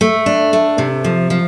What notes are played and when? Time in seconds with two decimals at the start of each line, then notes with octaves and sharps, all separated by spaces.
0.01 A3
0.26 D4
0.53 A3
0.78 C3
1.04 F3
1.30 F3